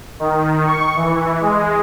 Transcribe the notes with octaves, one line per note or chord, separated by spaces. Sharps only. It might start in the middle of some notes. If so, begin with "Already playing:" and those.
D#3
C#6
E3
G#3